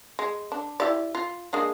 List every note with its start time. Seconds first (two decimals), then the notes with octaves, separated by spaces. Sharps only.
0.19 G#3
0.52 D4
0.80 E4 G4 D5
1.15 F4
1.53 G#3 A#3 D4